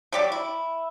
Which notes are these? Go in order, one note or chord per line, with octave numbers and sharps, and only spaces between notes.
F#3 G4 D5
E4